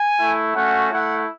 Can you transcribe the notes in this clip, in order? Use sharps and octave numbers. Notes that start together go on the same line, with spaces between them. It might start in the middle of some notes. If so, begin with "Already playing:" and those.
Already playing: G#5
A3 E4
A3 C#4 F#4 F#5
A3 E4 F#5